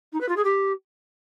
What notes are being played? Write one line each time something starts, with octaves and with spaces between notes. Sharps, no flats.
D#4
B4
F4
G#4
G4